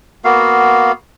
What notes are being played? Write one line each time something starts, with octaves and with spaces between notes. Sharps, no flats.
A#3 B3 F#4 F5